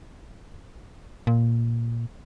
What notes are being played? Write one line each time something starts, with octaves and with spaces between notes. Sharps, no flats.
A#2